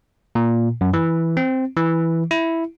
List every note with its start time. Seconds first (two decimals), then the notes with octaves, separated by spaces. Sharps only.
0.35 A#2
0.81 F#2
0.94 E3
1.37 C4
1.77 E3
2.31 E4